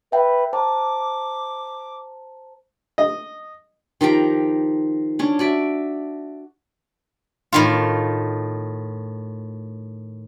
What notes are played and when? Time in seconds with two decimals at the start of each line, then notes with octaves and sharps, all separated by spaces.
0.12 B4 E5 G5
0.53 C5 A5 A#5 D6
2.98 D#5
4.01 D#3 F3 G4 A#5
5.19 C#4 D4
5.39 F#4 D5 E5
7.52 A2 D#3 F4